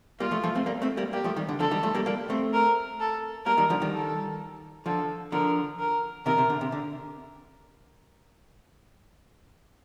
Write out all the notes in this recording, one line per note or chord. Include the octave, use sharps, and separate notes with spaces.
G3 A#3 F4
F3 A3
F3 A3
A3 C4
G3 A#3
A3 C4
G3 A#3
G3 A#3 G4
F3 A3
D#3 G3
D3
D3 F3 A4
D#3 G3
F3 A3
G3 A#3
G3 A#3
A3 C4
A#4
A4
G3 A#3 A#4
D#3 G3
D3 F3
D#3 G3
A4
D3 F3 A4
D3 F3 A#4
A#4
C3 D#3 A#4
C3
D3
C3
D3